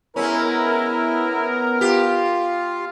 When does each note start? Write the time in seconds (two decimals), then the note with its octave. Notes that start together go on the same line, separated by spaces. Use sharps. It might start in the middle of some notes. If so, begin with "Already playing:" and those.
0.16 G#3 B3 C#4 E4 A#4
1.81 F4 G4